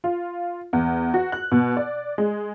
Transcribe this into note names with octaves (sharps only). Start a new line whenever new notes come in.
F4
E2
F#4
F#6
B2
D5
G#3